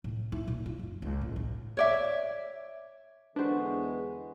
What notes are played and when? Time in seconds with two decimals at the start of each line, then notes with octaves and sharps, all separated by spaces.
0.04 A2
0.32 E4
0.47 A#2
0.66 F4
0.79 F#2
1.02 C#2
1.21 A2
1.36 A1
1.77 C#5 D5 E5
3.36 E2 D3 G#3 D4 F#4 B4 C5